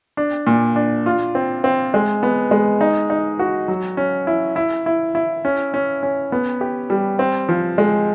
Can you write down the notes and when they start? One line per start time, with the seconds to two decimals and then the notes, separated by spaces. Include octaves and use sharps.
0.17 D4
0.47 A#2
0.76 D4
1.06 F4
1.35 C4
1.64 C4
1.94 G#3
2.23 B3
2.51 G#3
2.81 D#4
3.10 D#4
3.39 F#4
3.68 F#3
3.97 C#4
4.27 E4
4.56 E4
4.86 E4
5.15 E4
5.45 C#4
5.74 C#4
6.03 C#4
6.32 B3
6.61 G4
6.90 G3
7.19 C4
7.49 F3
7.78 G#3